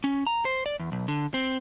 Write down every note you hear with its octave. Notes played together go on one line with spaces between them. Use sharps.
C#4
A#5
C5
D5
E2
B1
D3
C4